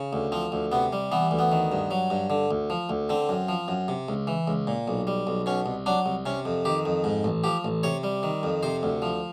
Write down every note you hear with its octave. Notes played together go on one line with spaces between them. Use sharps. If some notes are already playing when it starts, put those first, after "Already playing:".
Already playing: C#3
D2
F3 C4
D2
C3 B3
G3
E3 B3
D2
B3
D#3
G2
F#3
G2
D3
D2
F3
D2
D3 C4
F#2
F3
F#2
C3
C#2
E3
C#2
A#2
B1
G3
B1
B2 C#4
C2
F#3 D4
C2
C3 C#4
F2
D#3 G4
F2
G#2
A1
F3 G4
A1
C3 C#5
G3
D#3
F2
C3 C5
D2
F3